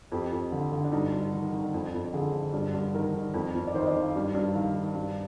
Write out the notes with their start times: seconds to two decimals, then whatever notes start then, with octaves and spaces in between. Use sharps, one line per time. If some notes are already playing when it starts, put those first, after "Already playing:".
0.12 F2 G4
0.32 F2
0.52 D3
0.72 D3
0.84 D4
0.92 G2 D#4
1.12 G2
1.33 D#3
1.52 D#3
1.74 F2
1.94 F2
2.13 D3 G#4
2.33 D3
2.53 G2
2.74 G2
2.94 D#3 A#4
3.14 D#3
3.34 F2
3.55 F2
3.67 D5
3.74 D#3 C5
3.81 D#5
3.88 D5
3.95 D#3
4.01 F5
4.16 G2
4.35 G2
4.55 D#3 F5
4.75 D#3
4.95 G2